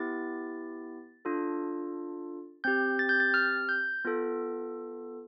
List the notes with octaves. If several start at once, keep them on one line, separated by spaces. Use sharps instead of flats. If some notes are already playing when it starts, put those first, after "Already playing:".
Already playing: B3 E4 G4 A6
D4 F4 A4
C4 G4 G6
A6
G6
A6
F6
G6
B3 F4 A4